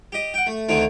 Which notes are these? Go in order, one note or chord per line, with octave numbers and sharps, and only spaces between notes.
G4 D#5
F#5 G5
A3
D2 D3 D#3 A3 C4